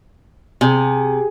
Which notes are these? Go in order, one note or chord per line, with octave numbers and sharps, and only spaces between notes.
C3 G#4